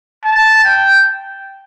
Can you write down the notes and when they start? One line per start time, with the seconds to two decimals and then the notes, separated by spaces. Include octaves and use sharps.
0.25 A5
0.64 G5